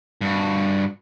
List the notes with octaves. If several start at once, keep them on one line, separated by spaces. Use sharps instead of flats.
G2 F#4